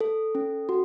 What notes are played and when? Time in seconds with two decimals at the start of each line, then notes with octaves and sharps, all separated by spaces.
0.01 A4
0.35 C#4
0.69 F#4